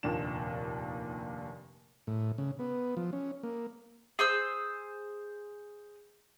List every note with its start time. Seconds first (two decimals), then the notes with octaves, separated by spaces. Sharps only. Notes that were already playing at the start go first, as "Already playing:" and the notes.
0.03 F1 D#2 A#2 D4 E7
2.07 A2
2.38 C#3
2.59 B3
2.97 F3
3.13 C#4
3.43 A#3
4.19 G#4 C5 E6